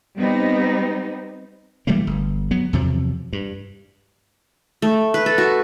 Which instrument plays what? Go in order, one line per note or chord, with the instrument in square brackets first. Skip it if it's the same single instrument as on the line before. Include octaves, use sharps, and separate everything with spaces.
[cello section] G3 B3 C4 D#4
[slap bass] E3 G3 A3 A#3
G1
F#3 B3
E2 C3 F3 F#3
G2
[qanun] A3
B4
A4
F#4